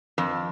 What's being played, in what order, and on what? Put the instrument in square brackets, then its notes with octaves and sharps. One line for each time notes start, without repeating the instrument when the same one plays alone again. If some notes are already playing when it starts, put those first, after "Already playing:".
[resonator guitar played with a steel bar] F2